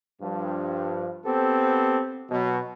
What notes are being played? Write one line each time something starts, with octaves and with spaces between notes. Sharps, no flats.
G2 F3
B3 C4 G4 A4
B2 F#3